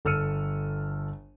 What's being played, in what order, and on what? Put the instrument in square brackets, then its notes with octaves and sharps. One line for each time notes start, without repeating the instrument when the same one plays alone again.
[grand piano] G1 A4 E6 F6 C#7 D#7